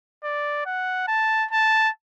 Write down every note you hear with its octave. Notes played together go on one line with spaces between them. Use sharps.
D5
F#5
A5
A5